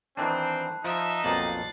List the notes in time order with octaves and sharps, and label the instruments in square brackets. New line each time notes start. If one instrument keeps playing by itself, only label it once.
[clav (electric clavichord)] D#3 E3 D4 [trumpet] C4 [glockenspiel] A5 B5 F#6
[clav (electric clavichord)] F3 [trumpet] D#4 [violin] E5
[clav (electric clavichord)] B1 F2 A#2 [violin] A6 C7 [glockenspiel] F#7